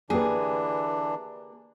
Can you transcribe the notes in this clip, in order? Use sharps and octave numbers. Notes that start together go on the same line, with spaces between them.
D3 E3 A#3 D4 G4 G#4 B4